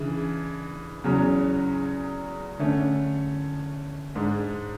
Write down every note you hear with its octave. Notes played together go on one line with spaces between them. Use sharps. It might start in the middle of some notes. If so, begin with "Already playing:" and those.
Already playing: C#3 E3 D4
E2 C#3 F#3 C#4
D3 A3 C#4
G#2 G#3 D4